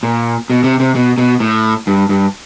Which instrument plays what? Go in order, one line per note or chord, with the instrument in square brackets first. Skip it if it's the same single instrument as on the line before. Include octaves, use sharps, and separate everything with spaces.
[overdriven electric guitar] A#2
B2
C3
C3
B2
B2
A2
G2
G2